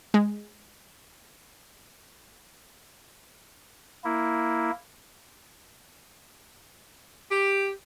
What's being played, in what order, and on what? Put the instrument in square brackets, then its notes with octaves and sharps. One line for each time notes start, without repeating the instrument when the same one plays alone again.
[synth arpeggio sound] G#3
[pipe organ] A#3 E4
[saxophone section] G4